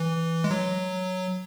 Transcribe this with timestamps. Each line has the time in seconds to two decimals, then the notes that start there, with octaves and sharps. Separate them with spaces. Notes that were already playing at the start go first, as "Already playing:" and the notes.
Already playing: E3
0.44 G#3
0.51 F#3